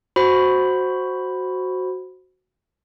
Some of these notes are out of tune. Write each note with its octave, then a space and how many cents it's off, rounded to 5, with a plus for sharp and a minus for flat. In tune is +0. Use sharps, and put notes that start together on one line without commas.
F#4 +0 C5 +0 B5 +0